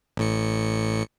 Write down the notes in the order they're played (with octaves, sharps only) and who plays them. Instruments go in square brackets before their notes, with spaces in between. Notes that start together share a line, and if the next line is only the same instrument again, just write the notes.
[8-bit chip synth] A1 A2 C#7